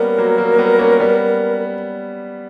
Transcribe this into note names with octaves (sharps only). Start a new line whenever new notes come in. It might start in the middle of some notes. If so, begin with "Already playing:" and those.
Already playing: G3 A#3 B3 C#4 A#4
F#3 A#3
F#3 A#3
A#3
G3 B3
A#3 C#4
G3 B3